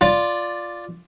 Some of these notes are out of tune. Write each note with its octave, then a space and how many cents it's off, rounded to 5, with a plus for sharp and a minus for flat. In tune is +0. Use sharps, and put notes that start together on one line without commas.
F4 +0 D5 +0